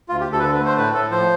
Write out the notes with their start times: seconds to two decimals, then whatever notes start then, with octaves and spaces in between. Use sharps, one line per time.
0.09 D2 F4
0.21 G4
0.27 D2
0.32 A4
0.39 B4
0.43 D3 A4
0.55 B4
0.61 A3 C5
0.77 A2 B4
0.94 A2 A4
1.11 F3 C5